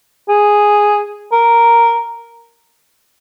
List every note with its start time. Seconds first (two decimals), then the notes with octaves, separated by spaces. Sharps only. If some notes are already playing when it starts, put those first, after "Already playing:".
0.29 G#4
1.32 A#4